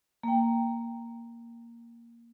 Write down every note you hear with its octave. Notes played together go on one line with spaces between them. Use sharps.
A#3 G5